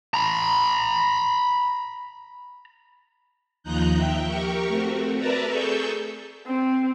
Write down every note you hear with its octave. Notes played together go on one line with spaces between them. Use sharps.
A#5 B5
D#2 F3 D#4 A#5 F#6 G6
E5 G5
G4 A#4 C#6
A3 C4 F#4
A#4 B4 D5 E5 A5 A#5
G#4 A4 C#6 E6 G6
C4